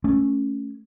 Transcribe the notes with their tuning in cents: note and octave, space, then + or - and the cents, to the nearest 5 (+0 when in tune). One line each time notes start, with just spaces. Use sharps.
A3 +0 C#4 +0